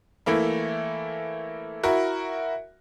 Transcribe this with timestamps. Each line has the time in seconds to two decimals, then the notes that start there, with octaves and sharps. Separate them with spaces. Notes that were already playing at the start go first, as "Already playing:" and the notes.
0.26 E3 A3 A#3 E4
1.83 E4 F#4 A#4